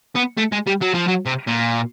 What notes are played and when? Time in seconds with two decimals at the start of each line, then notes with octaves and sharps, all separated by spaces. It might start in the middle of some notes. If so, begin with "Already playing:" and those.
0.15 B3
0.37 A3
0.52 G#3
0.67 G3
0.81 F#3
0.94 F3
1.07 F#3
1.26 C3
1.47 A#2